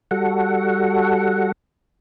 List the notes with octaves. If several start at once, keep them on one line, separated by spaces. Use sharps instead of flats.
G3 F#4 A4 F#5